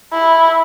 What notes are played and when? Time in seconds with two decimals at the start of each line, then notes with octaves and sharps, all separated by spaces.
0.13 E4